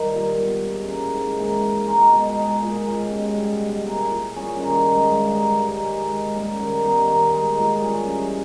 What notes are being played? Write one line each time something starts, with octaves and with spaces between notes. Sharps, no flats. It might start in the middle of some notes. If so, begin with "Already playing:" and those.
Already playing: D#3 G3
A#2
G3 B3
C#3
E3 A#3
G#2
E3 A#3 E4
E3
G#3 D#4 A#4
B2
G#3 D#4
A#2
G#3 C#4 G4
B2
G3 B3
B2
A#3 E4 G#4
A#2
G3 C#4 G#4
D#3
G#3 D#4
G2
G3 A#3
D#3
G#3 D#4
G#2
G3 A#3 C#4
D#3
G3 B3 D#4
D#3
G#3 D#4
A#2
G3 C#4 G#4
E3